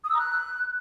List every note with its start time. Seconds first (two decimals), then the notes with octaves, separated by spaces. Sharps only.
0.04 D#6
0.09 E6
0.14 A#5
0.19 F#6